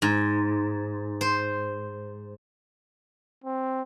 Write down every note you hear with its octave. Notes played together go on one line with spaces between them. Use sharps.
G#2
C5
C4